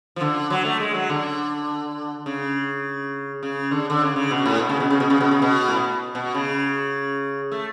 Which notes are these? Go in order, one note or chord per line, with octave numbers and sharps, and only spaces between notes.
F3
D3
F#3
A3
G#3
F#3
D3
C#3
C#3
D3
D3
C#3
C#3
B2
A2
B2
C#3
B2
C#3
B2
C#3
B2
C#3
B2
A2
B2
B2
C#3
A3